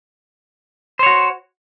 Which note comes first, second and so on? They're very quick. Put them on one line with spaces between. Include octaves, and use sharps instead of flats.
C5 C#5 F#4